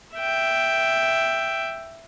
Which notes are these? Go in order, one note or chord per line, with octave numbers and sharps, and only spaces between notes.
E5 G5